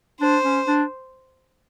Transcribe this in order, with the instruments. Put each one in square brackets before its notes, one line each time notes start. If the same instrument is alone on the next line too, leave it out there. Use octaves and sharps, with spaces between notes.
[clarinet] D4 [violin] C5
[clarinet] C#4
D4